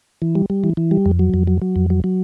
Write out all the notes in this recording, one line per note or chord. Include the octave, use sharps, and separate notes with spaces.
E3
G3
G3
E3
E3
G3
F2
F#3
F2
F#3
F#3
F2
F#3
F#3